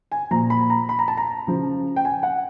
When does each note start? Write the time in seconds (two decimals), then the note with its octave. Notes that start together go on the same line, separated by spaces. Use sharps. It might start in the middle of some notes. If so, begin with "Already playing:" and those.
0.11 G#5
0.31 A#2 F3 A#5
0.50 B5
0.70 A#5
0.89 B5
0.99 A#5
1.08 A5
1.17 A#5
1.47 C#3 F3
1.96 G5
2.05 G#5
2.23 F#5